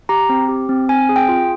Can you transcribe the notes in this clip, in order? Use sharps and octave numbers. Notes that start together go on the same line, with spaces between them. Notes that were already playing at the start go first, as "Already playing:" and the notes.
G4 A#5
C4
G4
C4
C4 G#5
G#4
G5
F4